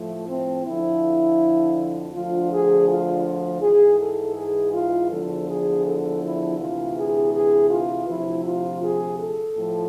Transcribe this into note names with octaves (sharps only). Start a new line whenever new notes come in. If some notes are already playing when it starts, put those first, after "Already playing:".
Already playing: A2 F3 A3
C4
F2 D3 F3 E4
D2 D3 F3 F4
G#4
F4
F4
G#2 E3 G#4
A4
G#4
F4
E2 D3 F3 A4
G#4
A4
E4
D2 C3 E3 F4
G#4
G#4
F4
D2 C3 F3 E4
F4
G#4
A4
A2 F3